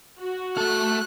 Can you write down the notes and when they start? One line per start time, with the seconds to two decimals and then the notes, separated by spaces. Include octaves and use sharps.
0.19 F#4
0.58 A3 A4 F#6